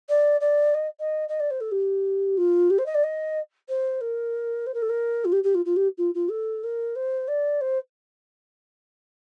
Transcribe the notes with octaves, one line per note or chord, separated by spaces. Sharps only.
D5
D5
D#5
D#5
D#5
D5
C5
A4
G4
F4
G4
C5
D#5
D5
D#5
C5
A#4
C5
A#4
A4
A#4
F4
G4
G4
F4
F4
G4
F4
F4
A4
A#4
C5
D5
C5